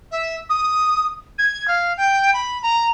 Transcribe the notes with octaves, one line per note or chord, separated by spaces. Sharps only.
E5
D#6
G#6
F5
G5
B5
A#5